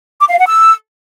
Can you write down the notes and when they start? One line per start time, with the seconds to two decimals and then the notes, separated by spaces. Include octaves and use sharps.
0.20 D6
0.29 F5
0.38 F#5
0.47 E6